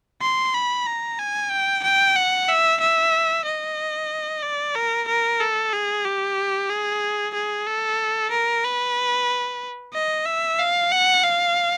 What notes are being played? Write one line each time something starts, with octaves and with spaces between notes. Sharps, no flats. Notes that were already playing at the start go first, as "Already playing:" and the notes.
C6
B5
A#5
G#5
G5
G5
F#5
E5
E5
D#5
D5
A#4
A#4
A4
G#4
G4
G#4
G#4
A4
A#4
B4
D#5
E5
F5
F#5
F5